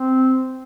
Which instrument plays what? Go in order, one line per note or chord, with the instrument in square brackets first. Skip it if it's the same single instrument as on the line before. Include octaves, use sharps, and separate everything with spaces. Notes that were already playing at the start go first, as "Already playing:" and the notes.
Already playing: [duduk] C4